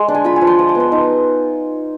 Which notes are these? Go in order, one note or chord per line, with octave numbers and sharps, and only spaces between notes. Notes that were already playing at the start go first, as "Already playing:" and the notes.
Already playing: G#3 C6
D4
G#5
F4 B5
G#5
F3
C6
F3 D#6
D6
B3
C6
D#4